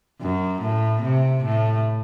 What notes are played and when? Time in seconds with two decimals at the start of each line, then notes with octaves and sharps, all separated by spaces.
0.21 F#2
0.62 A2
1.03 C3
1.44 A2